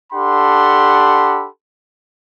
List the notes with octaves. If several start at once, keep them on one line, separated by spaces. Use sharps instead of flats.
D4 G4 A4 F#5 B5 C6